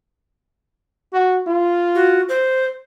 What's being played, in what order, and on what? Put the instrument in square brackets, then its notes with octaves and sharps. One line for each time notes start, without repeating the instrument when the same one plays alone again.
[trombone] F#4
F4
[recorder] F#4
C5